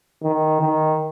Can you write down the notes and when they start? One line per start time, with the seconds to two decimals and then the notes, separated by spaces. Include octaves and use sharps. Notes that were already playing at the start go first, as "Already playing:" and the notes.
0.23 D#3
0.61 D#3